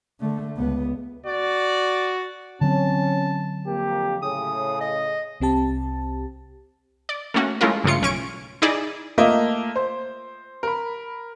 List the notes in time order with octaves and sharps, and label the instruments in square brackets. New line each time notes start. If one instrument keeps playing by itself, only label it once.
[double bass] D3 A3
C#2 B3
[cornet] F#4 [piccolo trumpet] D5
[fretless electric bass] D3 F#3 C4 [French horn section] C#4 [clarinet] A5
[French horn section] F2 A#3 [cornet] G4
[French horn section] A2 C#3 [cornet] G#4 [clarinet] D#6
[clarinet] D#5
[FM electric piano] C2 C4 G4 A5
[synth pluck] D5
A3 A#3 C#4 F#4
G#3 A3 C#4 E4 F4 A#4
G2 C#3 A3 F4 C#7
B1 C#4 C#6 D7
D#4 E4 G#4 D5 D#5
[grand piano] A3 A#3 F4 A#4 D#5 E5
C5
A#4 B5